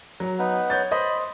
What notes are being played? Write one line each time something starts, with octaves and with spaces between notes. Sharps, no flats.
F#3 A#5
B3 D#4 B4
C#5 G6 A6
C5 D#5 B5